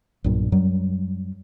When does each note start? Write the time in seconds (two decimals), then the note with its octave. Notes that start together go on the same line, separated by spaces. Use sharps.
0.24 B1 G2 A#2
0.52 F#2 F#3 G3